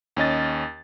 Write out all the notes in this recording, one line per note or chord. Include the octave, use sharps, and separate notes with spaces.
D#2 C#4 D#5 A6